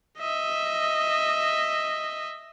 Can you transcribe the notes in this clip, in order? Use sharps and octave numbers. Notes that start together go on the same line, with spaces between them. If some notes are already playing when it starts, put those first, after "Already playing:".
D#5 E5